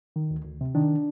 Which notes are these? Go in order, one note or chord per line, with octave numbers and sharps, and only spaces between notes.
D#3
D2
D2
C3
D#3 D4